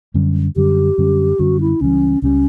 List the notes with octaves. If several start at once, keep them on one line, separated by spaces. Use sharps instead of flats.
F#2 D3 G3 C#4
F#2 D3 G3 C#4 G4
F#2 D3 G3 C#4
F#2 D3 G3 C#4 F#4
E4
C#2 C#3 E3 G3 C#4
C#2 C#3 E3 G3 C#4